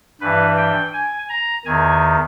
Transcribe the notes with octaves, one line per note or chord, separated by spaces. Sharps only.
G2 E3 B4
G5
G#5
A#5
E2 D#3 G#5